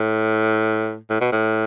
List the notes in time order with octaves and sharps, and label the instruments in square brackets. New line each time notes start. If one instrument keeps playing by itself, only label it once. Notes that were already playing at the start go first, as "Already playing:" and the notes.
Already playing: [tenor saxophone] A2
A2
B2
A2